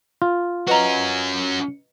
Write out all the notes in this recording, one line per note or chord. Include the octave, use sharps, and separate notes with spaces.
F4
C#4 F#4 B4 D#5 A#5